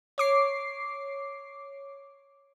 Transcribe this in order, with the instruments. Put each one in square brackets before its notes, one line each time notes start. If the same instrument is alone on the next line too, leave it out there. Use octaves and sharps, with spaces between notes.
[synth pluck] C#5 D6 C7